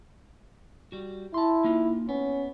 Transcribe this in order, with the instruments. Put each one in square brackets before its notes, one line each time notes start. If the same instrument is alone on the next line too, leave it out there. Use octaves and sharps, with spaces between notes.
[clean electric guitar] G3 F#4
[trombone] E4 [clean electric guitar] A5 C6
[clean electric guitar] A#3 D#4 F4
[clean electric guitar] B3 [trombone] C#4